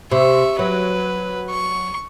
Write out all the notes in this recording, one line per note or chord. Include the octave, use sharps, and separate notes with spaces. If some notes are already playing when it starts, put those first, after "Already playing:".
C3 E5 C#6
F#3 B4
C#6